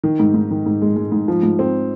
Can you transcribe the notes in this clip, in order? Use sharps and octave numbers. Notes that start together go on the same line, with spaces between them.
D#3
G#2
G#2
D#3
G#2
G#3
G#3
G#2
F3
G#2
C4